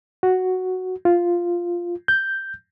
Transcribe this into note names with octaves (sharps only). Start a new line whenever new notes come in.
F#4
F4
G6